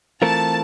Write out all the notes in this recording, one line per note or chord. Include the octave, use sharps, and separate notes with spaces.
E3 A3 C4 F4 A#4 A5